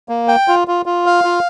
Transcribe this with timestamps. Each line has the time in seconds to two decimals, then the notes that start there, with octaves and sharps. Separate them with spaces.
0.09 A#3
0.28 G5
0.48 F4
0.68 F4
0.86 F4
1.06 F5
1.24 F4